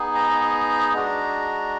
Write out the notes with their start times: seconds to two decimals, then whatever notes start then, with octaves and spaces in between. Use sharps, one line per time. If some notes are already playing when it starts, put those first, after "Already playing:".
Already playing: B3 D#4 G#4
0.15 A#5
0.94 G#3 D4 F#4